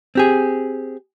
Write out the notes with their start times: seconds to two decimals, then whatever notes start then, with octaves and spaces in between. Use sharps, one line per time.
0.15 C4 G4 G#4